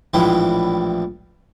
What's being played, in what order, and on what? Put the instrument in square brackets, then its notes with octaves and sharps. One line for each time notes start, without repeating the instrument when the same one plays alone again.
[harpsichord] A#1 A2 E3 G3 G#3 E4